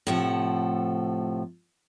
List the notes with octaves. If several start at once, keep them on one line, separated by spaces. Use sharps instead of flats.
A2 C3 F3 A4 F#5